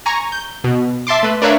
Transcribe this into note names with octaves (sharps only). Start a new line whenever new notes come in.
G#5 A#5 C#6
G6
B2
E5 A5 C6 D6
A3 B4
D4 A#4 B4 C#5 E5 F5